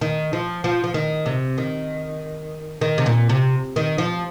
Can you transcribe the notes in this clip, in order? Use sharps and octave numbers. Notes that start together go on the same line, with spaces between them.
D#3
F3
F3
F3
D#3
C3
D#3
D#3
C3
A#2
C3
D#3
F3